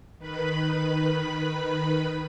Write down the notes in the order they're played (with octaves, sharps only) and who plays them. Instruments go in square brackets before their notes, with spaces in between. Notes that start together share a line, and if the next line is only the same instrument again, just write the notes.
[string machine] D#3 B4 B5